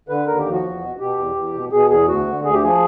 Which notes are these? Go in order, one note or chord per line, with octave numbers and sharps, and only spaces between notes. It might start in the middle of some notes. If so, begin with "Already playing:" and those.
D3 B4
D#2 A#4
G4
F3
F#4
E2
B2
B2 G4
E2
E2
B2
B2 G#4
E2 G#4
D2 F#4
D3
D2 G#4
G4
F3 G#4